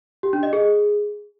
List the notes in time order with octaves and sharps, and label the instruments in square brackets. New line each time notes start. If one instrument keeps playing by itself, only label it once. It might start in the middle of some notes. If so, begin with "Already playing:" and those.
[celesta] G4
D4
D#5
G#4